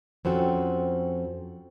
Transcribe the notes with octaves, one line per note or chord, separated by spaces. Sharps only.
F2 C4 C#4 F#4 A4